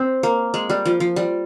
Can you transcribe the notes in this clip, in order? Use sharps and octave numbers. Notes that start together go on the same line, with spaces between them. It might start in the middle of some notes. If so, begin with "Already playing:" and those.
Already playing: C4
A#3
G#3
G3
F3
F3
G3